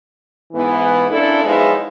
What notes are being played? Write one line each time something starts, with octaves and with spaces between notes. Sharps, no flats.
G#2 E3 B3
A#2 C#4 D4 E4 A4
F3 F#3 G#3 B3 D#4 E4